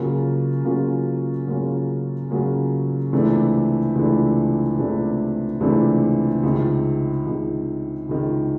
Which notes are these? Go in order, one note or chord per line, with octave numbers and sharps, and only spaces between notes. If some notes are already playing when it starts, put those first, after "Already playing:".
Already playing: C#3 F#3 A#3 C#4 F4
C#3 F#3 A#3 C#4 F4
C#3 F#3 A#3 C#4 F4
C#3 F#3 A#3 C#4 F4
C#2 C3 E3 A3 D4
C#2 C3 E3 A3 D4
C#2 C3 E3 A3 D4
C#2 C3 E3 A3 D4
C#2 C3 D#3
C#2 C3 D#3
C#2 C3 D#3